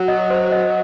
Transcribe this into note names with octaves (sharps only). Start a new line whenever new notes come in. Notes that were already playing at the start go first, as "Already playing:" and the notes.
Already playing: F#3
D#5
C5
D#5